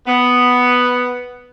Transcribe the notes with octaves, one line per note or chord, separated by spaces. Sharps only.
B3